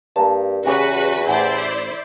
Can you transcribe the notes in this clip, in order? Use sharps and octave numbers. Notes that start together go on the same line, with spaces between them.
G2 A#3 A5
E2 C#3 F#4 G4 B4
A1 E4 C5 D5 F#5